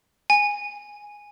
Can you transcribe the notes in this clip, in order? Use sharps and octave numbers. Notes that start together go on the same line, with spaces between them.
G#5